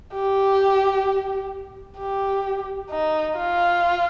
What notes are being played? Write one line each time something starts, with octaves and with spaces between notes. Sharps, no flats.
G4
G4
D#4
F4